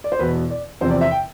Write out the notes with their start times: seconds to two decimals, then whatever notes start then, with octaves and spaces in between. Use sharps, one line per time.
0.04 D5
0.12 C5
0.19 E2 B2 B3 B4
0.50 D5
0.81 E2 C3 F3 C4 C5
0.91 D5
1.01 E5
1.11 G5